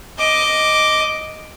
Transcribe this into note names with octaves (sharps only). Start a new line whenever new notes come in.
D#5 D6